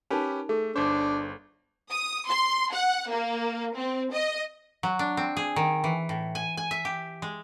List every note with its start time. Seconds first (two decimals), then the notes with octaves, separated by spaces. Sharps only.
0.10 C#4 D#4 G4 A#4 B4 G#5
0.49 A3 G#4 A4
0.76 G1 D4 C5 D6
1.90 D#6
2.27 C6
2.72 F#5
3.10 A#3
3.75 C4
4.12 D#5
4.83 F#3
4.99 D4
5.17 C4
5.37 G#4
5.56 D#3
5.84 E3
6.09 A2
6.35 G#5
6.57 G#5
6.71 E5
6.85 G4
7.22 G#3